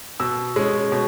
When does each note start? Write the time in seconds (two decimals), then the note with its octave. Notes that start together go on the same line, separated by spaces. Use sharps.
0.20 B2 E6
0.56 G#3 C#4
0.92 B2